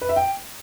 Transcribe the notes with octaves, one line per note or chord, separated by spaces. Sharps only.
B4
E5
G5